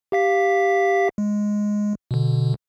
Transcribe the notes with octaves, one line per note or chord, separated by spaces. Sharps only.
G4 F5 B6
G#3
B2 D3